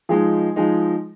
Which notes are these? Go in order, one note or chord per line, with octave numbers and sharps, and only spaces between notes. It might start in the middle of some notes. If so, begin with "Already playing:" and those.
F3 G#3 D#4 G#4
F3 G#3 D#4